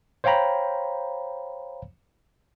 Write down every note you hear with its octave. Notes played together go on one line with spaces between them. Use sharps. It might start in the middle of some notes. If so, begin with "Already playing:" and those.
C5 C#5 F5 G5 A#5 B5